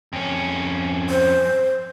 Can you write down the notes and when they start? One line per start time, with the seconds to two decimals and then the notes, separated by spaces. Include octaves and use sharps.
0.13 F2 C#4
1.10 C5